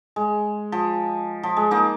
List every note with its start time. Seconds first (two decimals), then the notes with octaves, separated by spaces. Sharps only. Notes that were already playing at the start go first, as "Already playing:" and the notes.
0.16 G#3
0.72 F3
1.43 F3
1.57 G#3
1.71 A#3 D#4